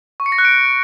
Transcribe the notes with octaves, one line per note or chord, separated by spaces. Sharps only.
C#6
C#7
A#6
F#6
D7